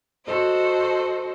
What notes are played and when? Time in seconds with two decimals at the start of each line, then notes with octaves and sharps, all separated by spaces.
0.25 F#4 A4 C5 D#5